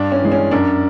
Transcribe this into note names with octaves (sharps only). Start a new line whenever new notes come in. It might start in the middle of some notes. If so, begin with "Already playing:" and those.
Already playing: G2 D4
C#4
E3 G#3
C#4
F#2 D4